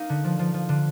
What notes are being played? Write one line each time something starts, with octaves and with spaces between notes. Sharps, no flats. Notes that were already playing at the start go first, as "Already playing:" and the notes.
Already playing: A#3 D#4
D3
F3
F3
F3
D3